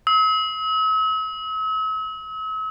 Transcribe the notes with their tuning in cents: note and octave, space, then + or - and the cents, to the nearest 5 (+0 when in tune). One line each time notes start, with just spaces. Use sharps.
E6 -45